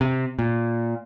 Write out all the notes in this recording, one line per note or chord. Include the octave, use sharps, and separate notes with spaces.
C3
A#2